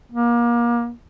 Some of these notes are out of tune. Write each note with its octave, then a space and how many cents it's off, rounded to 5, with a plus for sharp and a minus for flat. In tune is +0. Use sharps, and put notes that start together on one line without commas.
A#3 +30